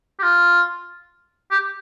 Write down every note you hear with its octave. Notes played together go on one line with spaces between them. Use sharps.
G4
F4
G4